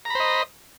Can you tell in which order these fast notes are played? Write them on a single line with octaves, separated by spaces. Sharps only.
A#5 B5 C5 D#5